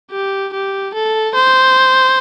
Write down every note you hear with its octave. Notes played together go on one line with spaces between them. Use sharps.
G4
G4
A4
C5